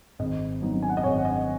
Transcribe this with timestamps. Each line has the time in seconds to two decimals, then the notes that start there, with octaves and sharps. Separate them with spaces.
0.19 G#1 D#5
0.61 F#2 F#3 B3 D#4
0.83 G#5
0.90 F#5
0.97 D#5
1.04 G#1 C#5
1.18 F#5
1.25 D#5